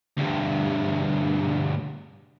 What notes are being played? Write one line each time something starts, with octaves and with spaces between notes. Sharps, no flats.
D2 G2